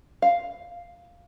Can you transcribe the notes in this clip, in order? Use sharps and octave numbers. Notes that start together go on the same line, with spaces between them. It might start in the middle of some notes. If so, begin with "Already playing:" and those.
F5